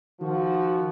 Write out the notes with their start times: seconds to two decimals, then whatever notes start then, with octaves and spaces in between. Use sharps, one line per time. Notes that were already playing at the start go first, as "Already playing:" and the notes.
0.21 D#3 F3 F#4